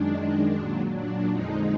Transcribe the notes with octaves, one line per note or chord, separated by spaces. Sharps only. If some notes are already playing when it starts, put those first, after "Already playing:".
Already playing: F#2 D#3 G#3 D4
A#2 F#3
D4
F2 D3 F3 G#3 D#4